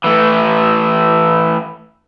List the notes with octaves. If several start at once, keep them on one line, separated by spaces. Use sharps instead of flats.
E3 A3